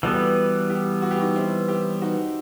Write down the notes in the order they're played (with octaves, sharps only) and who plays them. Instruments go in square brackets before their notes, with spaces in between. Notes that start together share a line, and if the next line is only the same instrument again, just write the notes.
[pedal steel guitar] E3 G3 B3 [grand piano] F#4 A4
[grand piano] E4 G4
F#4
G4
D#4 F#4
C4 E4
E4 G4
D#4 F#4